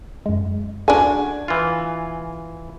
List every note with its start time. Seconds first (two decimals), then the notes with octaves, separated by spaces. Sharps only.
0.26 F#2 G#3
0.88 A3 D4 F#4 G#4 D5 G#5 A5
1.48 E3 F4